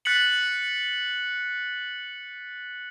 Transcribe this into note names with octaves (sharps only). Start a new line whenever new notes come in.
F#6 A6 B6 C#7 F#7